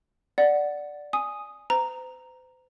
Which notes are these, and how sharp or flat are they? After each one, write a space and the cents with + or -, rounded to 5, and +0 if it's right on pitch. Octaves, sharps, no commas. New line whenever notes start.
D5 +0 F#5 +0
G#5 +0 D#6 +0
C5 -45 A#5 +0